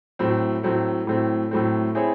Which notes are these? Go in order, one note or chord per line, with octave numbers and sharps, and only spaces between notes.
A2 F#3 A3 C4
A2 F#3 A3 C4
A2 F#3 A3 C4
A2 F#3 A3 C4
C4 E4 G#4 C#5